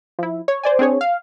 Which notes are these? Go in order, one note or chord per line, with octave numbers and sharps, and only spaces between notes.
F3 E4
C#5
C5 D5 G#5
C4 D4 G#4 C#5
F5